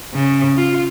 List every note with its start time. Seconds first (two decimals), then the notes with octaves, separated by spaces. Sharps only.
0.13 C#3
0.56 F4